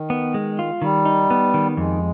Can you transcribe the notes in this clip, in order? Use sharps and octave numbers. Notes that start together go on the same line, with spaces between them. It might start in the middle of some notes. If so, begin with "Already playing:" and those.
Already playing: D#3
B3
G#3
F4
D#3 G3
D#4
B3
D#3
F2 G#3